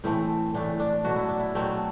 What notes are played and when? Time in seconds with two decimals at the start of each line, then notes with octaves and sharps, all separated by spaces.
0.04 A2 E3 A3 C4
0.54 A2 E3 A3 D4
0.80 D4
1.04 B2 F#3 A3 F#4
1.16 E4
1.28 D4
1.40 E4
1.55 B2 F#3 A3 C4